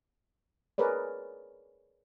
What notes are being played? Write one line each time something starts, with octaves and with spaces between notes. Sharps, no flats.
G#4 A#4 B4 C#5 D5